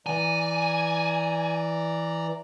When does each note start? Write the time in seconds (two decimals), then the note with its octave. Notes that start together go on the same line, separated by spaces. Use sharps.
0.07 E3 D5 G#5 A#5